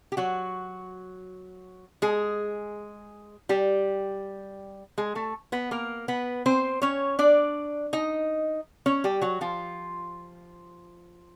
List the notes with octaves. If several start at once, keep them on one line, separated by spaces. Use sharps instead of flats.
G4
F#3 F#4
G#3 G#4
G3 G4
G#3 G#4
A3 A4
B3 B4
A#3 A#4
B3 B4
C4 C5
C#4 C#5
D4 D5
D#4 D#5
C#4 C#5
G3 G4
F#3 F#4
F3 F4